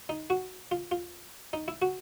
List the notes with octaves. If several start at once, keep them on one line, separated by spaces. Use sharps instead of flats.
D#4
F#4
F4
F4
D#4
E4
F#4